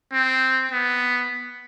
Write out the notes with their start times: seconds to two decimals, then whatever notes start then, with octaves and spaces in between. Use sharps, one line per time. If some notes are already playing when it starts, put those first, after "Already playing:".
0.12 C4
0.72 B3